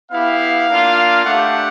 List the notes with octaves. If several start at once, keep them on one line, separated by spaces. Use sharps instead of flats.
B3 E4 G4 F5
A#3 D4 F4
A3 D4 G4 F#5